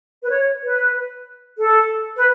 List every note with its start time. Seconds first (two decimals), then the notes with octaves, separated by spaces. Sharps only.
0.22 B4
0.30 C#5
0.62 B4
1.60 A4
2.16 B4